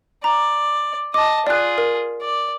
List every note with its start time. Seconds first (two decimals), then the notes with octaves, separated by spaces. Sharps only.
0.24 D5 A#5
1.14 D#5 A5 D6
1.47 F4 G#4 D5 F#6
1.78 A#4
2.22 D5